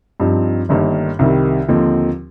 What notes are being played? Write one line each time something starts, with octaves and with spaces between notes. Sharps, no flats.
G2 F3 C4 D#4
G1 G2 D#3 A#3 D#4
C2 C3 D#3 G3
D#2 D3 F3 C4 D#4